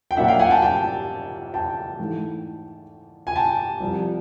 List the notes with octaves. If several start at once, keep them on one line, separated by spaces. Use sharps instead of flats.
G5
A#2 F#3 A#3 D4 E5 F#5
F5 G5
F#5 G#5
G5 A5
G5 A5
G5 A5
G#2 E3 A3
G#5
G5 A5
C2 C3 F3